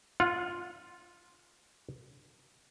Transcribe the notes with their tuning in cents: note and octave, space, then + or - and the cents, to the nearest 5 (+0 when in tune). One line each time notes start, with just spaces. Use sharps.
F4 +0 F#5 -45